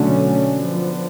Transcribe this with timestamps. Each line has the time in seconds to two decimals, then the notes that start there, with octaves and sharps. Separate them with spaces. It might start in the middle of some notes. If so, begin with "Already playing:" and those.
Already playing: B2 D3 F#3 A3 C#4 D4
0.53 F3 B3